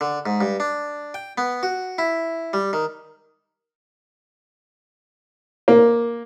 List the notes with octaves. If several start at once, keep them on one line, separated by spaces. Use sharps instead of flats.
D3
G#2
G2
D4
G5
B3
F#4
E4
G3
D#3
A#3